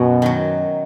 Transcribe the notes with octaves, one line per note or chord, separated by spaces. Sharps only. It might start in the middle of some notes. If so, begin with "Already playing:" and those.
Already playing: F#2 B2
D#3 F#3